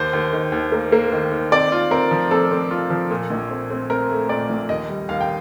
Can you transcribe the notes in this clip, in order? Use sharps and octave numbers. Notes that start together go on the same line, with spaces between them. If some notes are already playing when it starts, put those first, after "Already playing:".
Already playing: D#2 C5
D#2
D#3
D#2
A#3
A#3
D#3
D#3
C4 D5
F4
C4 A#4
F3
C4 A4
C4
F4
F3
A#2
A#1
C4
C4
C4 A#4
A3
A#2 D5
A#1
D#2 D#5
G3
D#2 F5
G5